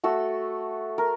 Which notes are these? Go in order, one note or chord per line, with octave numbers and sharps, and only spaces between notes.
A3 F#4 A4 E6
A#4